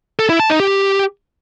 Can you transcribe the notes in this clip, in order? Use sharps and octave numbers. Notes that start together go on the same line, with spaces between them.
A4
E4
A5
D#4
G4